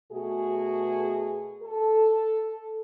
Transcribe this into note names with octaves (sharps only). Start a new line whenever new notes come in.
B2 A3 F#4 G#4
A4